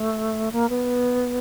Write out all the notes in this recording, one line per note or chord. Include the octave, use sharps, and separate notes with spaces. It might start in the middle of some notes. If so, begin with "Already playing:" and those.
Already playing: A3
A#3
B3